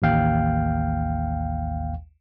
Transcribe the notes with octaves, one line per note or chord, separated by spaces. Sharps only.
A1 D#2 F5 G5